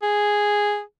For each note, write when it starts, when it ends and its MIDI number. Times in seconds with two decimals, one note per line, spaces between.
0.03 0.81 68